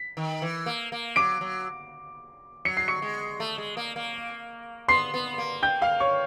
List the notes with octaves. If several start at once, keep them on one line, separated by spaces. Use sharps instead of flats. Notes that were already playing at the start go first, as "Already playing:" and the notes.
Already playing: B6
D#3
E3
A#3
A#3
F#3 D6 D7
F#3
F#3 C#7
C7
C#6 C#7
G#3
A3
G#3
A#3
A#3
B3 C6 C7
B3
A#3
G5 G6
F5 F6
C#5 C#6